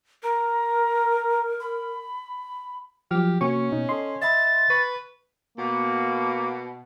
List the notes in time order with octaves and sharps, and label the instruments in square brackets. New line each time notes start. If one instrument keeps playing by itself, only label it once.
[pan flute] A#4 [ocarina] A#5
[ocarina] B5
[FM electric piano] F3 [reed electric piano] F#3 F6 [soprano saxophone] G4
[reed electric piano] C3 [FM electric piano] A#3 F#4 C#6 [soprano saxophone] C#4
[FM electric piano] B2 [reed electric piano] D#4
[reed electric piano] A4 D#5 [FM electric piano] C6
[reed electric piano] D#5 E5 B5 [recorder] A6
[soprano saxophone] B4 [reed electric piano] C#6
[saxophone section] B2 [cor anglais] A#3